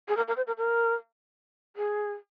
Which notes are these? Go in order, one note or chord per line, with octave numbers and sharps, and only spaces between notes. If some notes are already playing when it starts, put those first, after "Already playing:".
G#4
A#4
A#4
C5
A#4
A#4
G#4